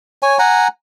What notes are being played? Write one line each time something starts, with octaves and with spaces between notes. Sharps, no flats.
C#5 G#5
F#5 G#5 A#5